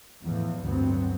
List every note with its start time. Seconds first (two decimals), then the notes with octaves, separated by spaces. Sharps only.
0.23 E2 A2 E3 F3
0.63 D2 G2 F#3 B3 C4